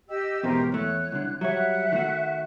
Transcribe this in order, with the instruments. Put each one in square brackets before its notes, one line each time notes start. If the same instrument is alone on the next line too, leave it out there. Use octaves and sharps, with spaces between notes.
[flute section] G4 D#5 E6
[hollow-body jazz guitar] E2 G#2 B2 [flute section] G4 A#4 C5
[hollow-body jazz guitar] E2 A3 [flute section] C#5 F#6
[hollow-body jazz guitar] C2 D3
[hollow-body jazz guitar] F#3 G3 C#5 [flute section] E5 F#5 F#6
[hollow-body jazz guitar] D#3 A3 F#4